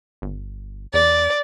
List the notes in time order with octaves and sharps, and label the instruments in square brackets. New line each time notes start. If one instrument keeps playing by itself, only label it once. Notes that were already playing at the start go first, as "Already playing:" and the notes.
[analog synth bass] G1
[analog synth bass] E2 [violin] D5